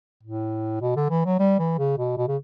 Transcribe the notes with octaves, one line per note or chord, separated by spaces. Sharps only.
A2
B2
D3
E3
F#3
G3
E3
C#3
B2
B2
C#3